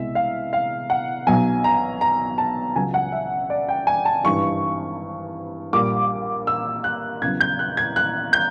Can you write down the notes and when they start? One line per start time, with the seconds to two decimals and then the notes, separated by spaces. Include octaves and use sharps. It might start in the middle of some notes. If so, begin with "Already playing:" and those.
Already playing: C2 B2 G#3 E5
0.15 F5
0.53 F5
0.90 F#5
1.27 B1 B2 F#3 G#5
1.64 A#5
2.01 A#5
2.38 A5
2.76 C#2 C#3 F#3 G#5
2.94 F#5
3.12 E5
3.50 D5
3.69 G5
3.87 G#5
4.05 A5
4.24 G#1 G2 E3 G3 C#6
5.73 A#1 A#2 G3 D6
6.47 E6
6.84 F#6
7.22 E2 C#3 F#3 G#6
7.41 G6
7.59 F#6
7.77 G#6
7.96 F#6
8.33 G6